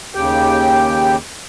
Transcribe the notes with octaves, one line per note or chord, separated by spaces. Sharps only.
D#2 C#3 G4 G5